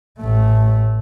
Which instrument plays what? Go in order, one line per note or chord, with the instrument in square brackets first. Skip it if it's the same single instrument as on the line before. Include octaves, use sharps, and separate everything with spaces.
[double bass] A1 A3